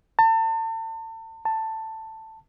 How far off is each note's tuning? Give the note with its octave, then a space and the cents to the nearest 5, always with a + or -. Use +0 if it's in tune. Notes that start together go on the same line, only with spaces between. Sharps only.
A5 +35
A5 +10